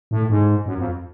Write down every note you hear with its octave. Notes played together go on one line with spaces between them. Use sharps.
A2
G#2
F#2
F2